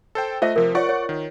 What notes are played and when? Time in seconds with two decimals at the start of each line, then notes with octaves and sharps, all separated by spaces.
0.15 A4 C5 G5
0.42 A3 F4 C5 D#5 E5
0.56 C3 F3 A#4
0.75 F4 C#5 D5 F#5 C#6
0.89 C#5
1.09 D#3